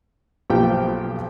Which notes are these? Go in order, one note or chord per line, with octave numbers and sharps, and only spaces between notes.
B1 F3 A#3 G4 G5